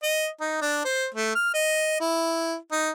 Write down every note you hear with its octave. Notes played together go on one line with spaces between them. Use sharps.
D#5
D#4
D4
C5
A3
F6
D#5
E4
D#4